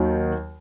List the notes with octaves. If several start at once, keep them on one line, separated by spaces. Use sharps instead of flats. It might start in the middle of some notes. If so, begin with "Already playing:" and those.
Already playing: D#2 D#3 F#3